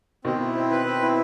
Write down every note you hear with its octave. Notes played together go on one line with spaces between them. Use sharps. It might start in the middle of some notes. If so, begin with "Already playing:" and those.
B2 D#3 C4
E4
C4
B4
C4
E4